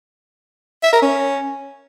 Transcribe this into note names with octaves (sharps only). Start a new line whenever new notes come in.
E5
A#4
C#4